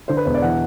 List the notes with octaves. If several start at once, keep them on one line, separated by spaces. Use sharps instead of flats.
D3 C5
B4
E1 C5
D5
E3 F#5